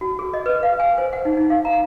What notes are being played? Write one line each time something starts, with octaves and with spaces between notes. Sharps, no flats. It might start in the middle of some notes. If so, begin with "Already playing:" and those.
F#4
G#4
D#5
B4
F5
G#5
C5
F#5
D#4
D#4
F5
A#5